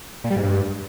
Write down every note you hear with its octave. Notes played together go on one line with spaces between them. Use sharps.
A#2
G3
G#2
G2